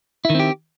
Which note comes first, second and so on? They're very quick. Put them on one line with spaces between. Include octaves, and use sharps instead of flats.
E4 D#3 C4 G4